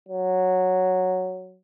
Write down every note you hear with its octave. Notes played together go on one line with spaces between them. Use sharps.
F#3